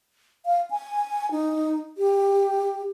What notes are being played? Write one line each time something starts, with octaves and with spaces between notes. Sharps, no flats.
F5
G#5
D#4
G4